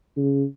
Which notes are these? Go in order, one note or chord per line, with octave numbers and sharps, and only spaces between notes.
C#3